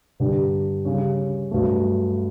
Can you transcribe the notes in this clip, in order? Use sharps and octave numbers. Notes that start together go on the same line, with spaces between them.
G2 D3 G3 D4 G4
C#3 G3 C#4
G2 F#3 A3